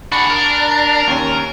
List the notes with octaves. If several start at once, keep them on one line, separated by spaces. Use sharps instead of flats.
D4 F#4 G#4 B5 C#7
A#4
D#2 C#4